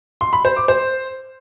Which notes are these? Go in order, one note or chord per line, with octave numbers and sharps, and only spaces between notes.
C6
B5
C5
D6
C5